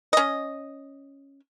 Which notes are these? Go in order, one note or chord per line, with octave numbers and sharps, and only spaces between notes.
C#4 D#5